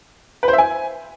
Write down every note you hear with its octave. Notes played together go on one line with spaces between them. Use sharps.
B4
C5
E5
G#5